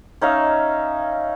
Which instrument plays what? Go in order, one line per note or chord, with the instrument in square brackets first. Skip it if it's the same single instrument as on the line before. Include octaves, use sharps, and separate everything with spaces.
[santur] C#4 D#4 E5 F5